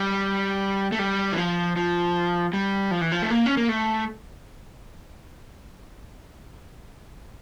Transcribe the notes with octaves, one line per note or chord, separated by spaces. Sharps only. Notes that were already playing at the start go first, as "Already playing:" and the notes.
Already playing: G3
A3
G3
E3
F3
F3
G3
F3
E3
F3
A3
A#3
C#4
A#3
A3